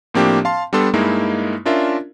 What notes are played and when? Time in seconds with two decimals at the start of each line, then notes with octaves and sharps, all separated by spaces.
0.14 A2 F3 A#3 C4 D4 G4
0.45 F5 A5 C6
0.73 G3 B3 D4 A4 C6
0.93 G2 G#3 A#3 D#4 E4
1.65 C#4 D4 F4 A#4 E5